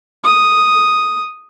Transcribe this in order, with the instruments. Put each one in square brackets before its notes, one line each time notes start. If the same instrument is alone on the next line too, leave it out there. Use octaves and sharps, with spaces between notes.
[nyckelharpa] D#6